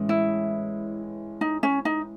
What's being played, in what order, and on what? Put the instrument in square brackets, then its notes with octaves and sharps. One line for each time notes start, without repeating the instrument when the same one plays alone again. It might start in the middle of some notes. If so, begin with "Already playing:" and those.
Already playing: [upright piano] A2 E3 G#3 C#4
[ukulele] E4
D#4
C#4
D#4